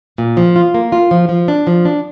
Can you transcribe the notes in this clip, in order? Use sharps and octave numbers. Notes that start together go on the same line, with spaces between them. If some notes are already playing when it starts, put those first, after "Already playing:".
A#2
F3
F4
A#3
F4
F3
F3
D4
F3
D4